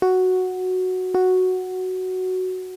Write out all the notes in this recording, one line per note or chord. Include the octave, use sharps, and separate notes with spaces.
F#4
F#4